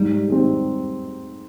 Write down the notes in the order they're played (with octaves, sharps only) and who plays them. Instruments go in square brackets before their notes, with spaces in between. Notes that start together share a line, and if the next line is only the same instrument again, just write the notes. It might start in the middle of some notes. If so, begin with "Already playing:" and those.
Already playing: [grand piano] G#2 [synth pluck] G3
[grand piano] D#3 G#3 C4